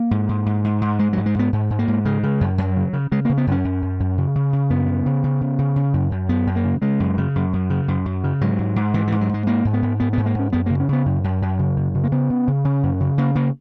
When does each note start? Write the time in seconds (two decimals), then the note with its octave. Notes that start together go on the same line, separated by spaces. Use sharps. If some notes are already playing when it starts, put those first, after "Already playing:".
Already playing: A#3
0.11 G#2
0.29 G#2
0.46 G#2
0.64 G#2
0.81 G#2
0.99 G#2 G#3
1.13 F#3
1.17 G#2
1.26 G#3
1.35 G#2 B3
1.53 G#2
1.70 G#2
1.79 A#3
1.88 G#2
2.05 C#3 G#3
2.23 C#3
2.41 F#2
2.58 F#2 F#3
2.77 C#3
2.93 C#3
3.12 C#3 G#3
3.25 A#3
3.29 C#3
3.38 B3
3.47 F#2 C#4
3.64 F#2
3.82 F#2
4.00 F#2
4.18 C#3
4.35 C#3
4.53 C#3
4.70 F#2 B3
4.88 C#3
5.06 C#3
5.24 C#3
5.41 C#3
5.59 C#3
5.76 C#3
5.94 F#2
6.11 F#2
6.29 F#2 B3
6.47 F#2
6.56 A#3
6.65 C#3
6.82 C#3 G#3
7.00 F#2
7.18 C#3
7.36 F#2
7.53 F#2
7.70 C#3
7.88 F#2
8.06 F#2
8.24 C#3
8.41 G#2 F#3
8.59 G#2
8.76 G#2
8.94 G#2 E3
9.07 E3
9.12 G#2
9.21 F#3
9.29 G#2 G#3
9.47 G#2 A#3
9.65 G#2
9.73 B3
9.82 G#2
10.00 G#2 B3
10.13 B3
10.17 G#2
10.26 A#3
10.35 G#2 C#4
10.53 F#2 B3
10.66 C#3 A#3
10.80 C#4
10.89 C#3 B3
11.06 F#2
11.24 F#2
11.42 F#2
11.59 C#3
11.77 F#2
11.95 C#3
12.04 A#3
12.12 C#3 B3
12.30 C#3
12.48 C#3
12.65 C#3 C#4
12.83 F#2
13.00 C#3
13.18 C#3 A#3
13.35 C#3 A#3